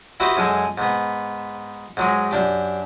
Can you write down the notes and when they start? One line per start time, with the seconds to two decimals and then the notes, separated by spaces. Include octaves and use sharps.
0.20 E4 F#4 G4 B4 C5 D#5
0.37 F#2 G#3 G#4 A4 G#5
0.78 G#2 B3
1.97 G#2 F#3 G#3
2.31 F#2 D4 G4